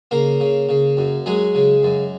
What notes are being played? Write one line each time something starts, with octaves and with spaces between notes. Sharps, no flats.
C#3 A#3 A#4
C#3
C#3
F#2
F#3 G#3 G#4
C#3
F#2